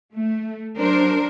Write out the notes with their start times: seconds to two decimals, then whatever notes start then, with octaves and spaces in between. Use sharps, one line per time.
0.14 A3
0.77 F#3 D4 A#4 C5